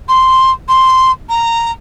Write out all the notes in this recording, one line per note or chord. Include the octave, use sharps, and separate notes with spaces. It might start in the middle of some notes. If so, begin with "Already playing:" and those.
C6
C6
A#5